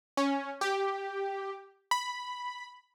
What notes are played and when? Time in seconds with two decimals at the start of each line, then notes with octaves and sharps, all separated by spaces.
0.17 C#4
0.61 G4
1.91 B5